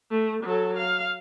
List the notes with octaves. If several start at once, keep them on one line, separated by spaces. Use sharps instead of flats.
A3
F#3 A4
F5